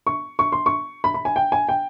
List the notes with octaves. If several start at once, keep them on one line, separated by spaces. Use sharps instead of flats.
C#6
C#6
C6
C#6
B5
B5
G#5
G5
G#5
G5